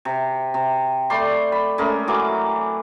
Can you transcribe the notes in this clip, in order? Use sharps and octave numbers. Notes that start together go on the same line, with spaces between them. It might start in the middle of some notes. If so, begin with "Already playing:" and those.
C3
C3
A3 D5 B5 C6
B5
G#3 A3 C#4 A#4
E3 F#3 D6